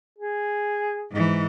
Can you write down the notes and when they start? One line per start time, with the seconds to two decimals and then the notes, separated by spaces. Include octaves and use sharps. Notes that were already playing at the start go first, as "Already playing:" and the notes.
0.18 G#4
1.11 G#2 E3